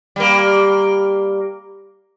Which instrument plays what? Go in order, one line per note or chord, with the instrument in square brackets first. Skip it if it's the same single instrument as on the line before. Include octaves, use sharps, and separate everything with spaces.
[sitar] G3 A#3